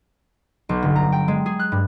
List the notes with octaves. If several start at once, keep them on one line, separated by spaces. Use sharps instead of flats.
B1
G1
A#5
G5
G#3
G#4
F#6
G2